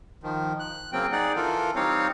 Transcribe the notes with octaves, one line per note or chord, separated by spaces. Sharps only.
D#3 F3
F#6
C#3 F#3 A#3 C4 G5
D#4 G#4 D5 F#5
E3 F4 A4 A#4
G3 C4 D#4 C#5 F5